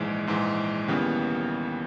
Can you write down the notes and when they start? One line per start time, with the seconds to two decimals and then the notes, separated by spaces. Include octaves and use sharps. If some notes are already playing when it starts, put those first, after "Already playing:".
Already playing: A#1 G#2 E3 G#3
0.27 A#1 G#2 E3 G#3
0.88 D#2 C#3 E3 G3 B3